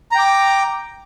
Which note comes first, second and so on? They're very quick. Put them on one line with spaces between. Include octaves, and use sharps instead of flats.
A#5 G5 D6